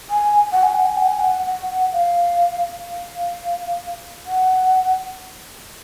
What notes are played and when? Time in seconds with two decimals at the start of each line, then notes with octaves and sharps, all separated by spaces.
0.10 G#5
0.52 F#5
0.63 G#5
0.75 F#5
0.86 G#5
0.97 F#5
1.08 G#5
1.20 F#5
1.46 F#5
1.69 F#5
1.93 F5
2.86 F5
4.26 F#5